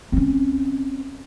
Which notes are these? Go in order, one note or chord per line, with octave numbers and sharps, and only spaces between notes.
C4 C#4